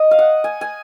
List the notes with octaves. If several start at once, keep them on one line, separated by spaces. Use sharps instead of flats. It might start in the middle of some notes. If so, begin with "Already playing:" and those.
Already playing: D#5
F5
F#5
G#5
G#5